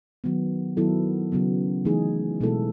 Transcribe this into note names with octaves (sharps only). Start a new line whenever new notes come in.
D#3 F#3 B3
D#3 F#3 B3 E4 A4
C#3 F#3 B3
E3 A3 D#4 G#4
B2 G#3 B3 E4 A4